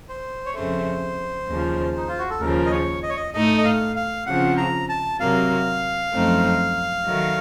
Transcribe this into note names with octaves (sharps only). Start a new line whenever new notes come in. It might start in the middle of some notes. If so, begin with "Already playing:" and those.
C5
C#5
F2 C#3 A3 C5
D#2 C#3 F3
D#4
F4
F#4
A4
D#2 C#3 F3 A#4
D#5
C#5
D#5
C#5
D#5
A2 A3 D#4 A4 D#5
D#5
F5
F5
C#3 F3 C4 F#5
A#5
A5
C3 F#3 A#3 F5
F#2 F3 A3 C4 D#4
D#3 F#3 A3